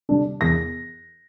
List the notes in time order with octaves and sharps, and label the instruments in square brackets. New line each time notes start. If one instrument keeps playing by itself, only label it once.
[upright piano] D3 G3 D4
E2 A#6